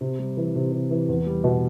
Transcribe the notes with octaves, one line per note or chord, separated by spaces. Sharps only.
C3
G3
E3
C3
C3
E3
E2
G3
B2